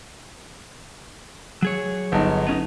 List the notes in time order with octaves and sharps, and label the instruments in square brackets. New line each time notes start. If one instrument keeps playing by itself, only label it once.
[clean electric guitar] F#3 G#4 C#5
[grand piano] G1 D#4
[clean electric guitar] B3 C#4 D#4